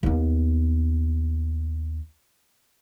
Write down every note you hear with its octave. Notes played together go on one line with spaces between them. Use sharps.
D#2 B3